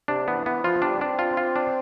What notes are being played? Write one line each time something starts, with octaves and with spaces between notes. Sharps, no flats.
C3 D4
E3 B3
E3 B3
F3 F4
G3 D4
C4 D4
F4
F4
D4